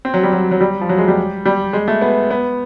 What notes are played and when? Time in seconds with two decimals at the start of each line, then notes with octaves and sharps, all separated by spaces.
0.05 C4
0.14 F#3
0.23 G3
0.33 F#3
0.51 F#3
0.61 G3
0.81 F3
0.89 F#3
0.98 G#3
1.08 G3
1.45 G3
1.73 G#3
1.88 A3
2.01 B3
2.31 B3